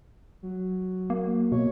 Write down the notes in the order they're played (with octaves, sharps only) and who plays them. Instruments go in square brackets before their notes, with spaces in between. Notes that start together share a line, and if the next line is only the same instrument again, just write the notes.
[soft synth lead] F#3
[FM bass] A#3
[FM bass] B2 [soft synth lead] C#5